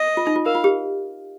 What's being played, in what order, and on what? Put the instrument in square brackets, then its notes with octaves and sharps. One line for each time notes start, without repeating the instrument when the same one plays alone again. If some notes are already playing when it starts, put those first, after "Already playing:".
Already playing: [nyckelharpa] D#5
[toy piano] F4
D#4
F4
[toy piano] A#4 [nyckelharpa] F5
[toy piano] F4
G4